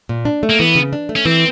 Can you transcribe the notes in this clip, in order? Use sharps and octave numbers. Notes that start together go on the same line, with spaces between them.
A#2
D4
A3
A#3
E3 B3
C#3
D4
A3
C#4
E3 C4